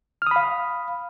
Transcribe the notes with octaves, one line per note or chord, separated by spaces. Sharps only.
F5 B5 D#6 F6